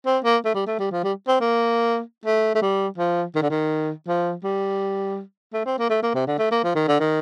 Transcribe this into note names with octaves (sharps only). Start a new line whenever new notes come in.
C4
A#3
A3
G3
A3
G3
F3
G3
C4
A#3
A3
A3
G3
F3
D#3
D3
D#3
F3
G3
A3
C4
A#3
A3
A#3
C3
D3
A3
A#3
F3
D#3
D3
D#3